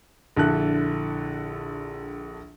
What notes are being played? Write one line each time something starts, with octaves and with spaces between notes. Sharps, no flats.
A#1 D3 E4 A4 F#6